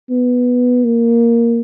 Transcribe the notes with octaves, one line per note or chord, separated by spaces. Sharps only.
B3
A#3